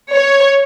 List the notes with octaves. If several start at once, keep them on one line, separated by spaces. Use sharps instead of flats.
C#5